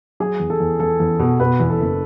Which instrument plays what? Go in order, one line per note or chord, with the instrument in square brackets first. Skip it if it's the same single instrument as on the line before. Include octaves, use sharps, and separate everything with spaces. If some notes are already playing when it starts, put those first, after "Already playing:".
[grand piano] F#3 [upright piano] G#4
[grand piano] E2
[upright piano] A4
[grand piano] E2
[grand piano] E2 [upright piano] A4
[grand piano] E2
B2
[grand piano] B2 [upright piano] B4
[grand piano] E2
[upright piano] A4
[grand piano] F#1